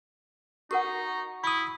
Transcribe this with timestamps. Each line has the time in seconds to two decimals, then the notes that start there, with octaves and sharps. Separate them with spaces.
0.71 D#4 F#4 A#4 F#5 C#6
1.44 E4 B5 D#6